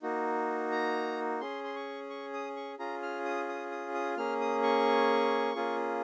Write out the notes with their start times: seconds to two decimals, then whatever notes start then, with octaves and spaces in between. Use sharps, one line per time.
0.02 A#3 D#4 F#4
0.72 A#5
1.41 C#4 G#4 C6
1.64 C6
1.76 C#6
2.10 C#6
2.33 D#6
2.56 C#6
2.79 C#4 F4 G#4 A#5
3.03 F6
3.25 D#6
3.48 D#6
3.71 D#6
3.94 D#6
4.17 A#3 C#4 G#4 F6
4.41 D#6
4.63 C#6
5.55 A#3 C#4 F4 G#4